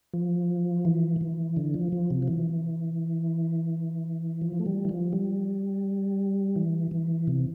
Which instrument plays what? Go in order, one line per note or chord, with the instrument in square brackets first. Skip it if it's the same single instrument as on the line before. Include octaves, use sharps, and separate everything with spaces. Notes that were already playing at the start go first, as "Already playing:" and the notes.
[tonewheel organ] F3
E3
F3
E3
D3
F3
F3
C3
F3
E3
F3
A3
G3
E3
F3
G3
E3
E3
C3